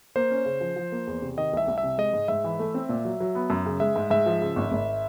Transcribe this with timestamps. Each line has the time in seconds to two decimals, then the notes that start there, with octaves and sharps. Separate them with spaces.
0.16 A#3 C5
0.31 C#4
0.46 C#3
0.61 F3
0.76 F3
0.92 A#3
1.07 E2
1.22 C3
1.37 D#3 D#5
1.53 C2 E5
1.68 C2
1.78 E5
1.83 C3
1.98 G#3 D#5
2.13 G#2
2.28 G#2 E5
2.44 E3
2.59 A3
2.74 C4
2.89 A#2
3.05 F#3
3.20 F#3
3.35 B3
3.50 F#2
3.66 C#3
3.80 G#3 E5
3.96 G#2
4.10 G#2 E5
4.26 F3
4.41 C#3
4.56 G#1
4.72 G#1